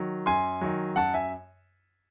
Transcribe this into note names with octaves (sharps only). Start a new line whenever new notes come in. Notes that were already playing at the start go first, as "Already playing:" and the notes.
Already playing: D#3 F#3
F#2 G#5 C6
D#3 F#3
F#2 F#5 A5
E5 G#5